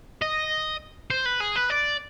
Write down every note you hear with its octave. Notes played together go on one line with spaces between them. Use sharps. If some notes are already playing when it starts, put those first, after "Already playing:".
D#5
C5
B4
G#4
B4
D5